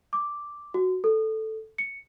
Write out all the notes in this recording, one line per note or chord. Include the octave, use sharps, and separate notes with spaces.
D6
F#4
A4
C#7